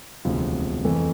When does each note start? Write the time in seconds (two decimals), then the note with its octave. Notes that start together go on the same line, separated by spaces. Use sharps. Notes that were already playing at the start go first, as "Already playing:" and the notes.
0.25 E1 D2 C3 F3
0.85 F2 E3 A3